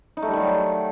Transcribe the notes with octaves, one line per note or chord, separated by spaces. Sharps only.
D#4
A3
G3
D#3
F#3